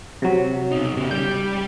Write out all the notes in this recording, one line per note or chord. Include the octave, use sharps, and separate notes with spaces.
C3 F#3
B2 D#4
C#3 G4
G3 G4 G6